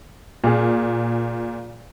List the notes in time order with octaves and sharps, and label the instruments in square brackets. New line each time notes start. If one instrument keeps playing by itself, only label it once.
[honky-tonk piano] A#2 G#4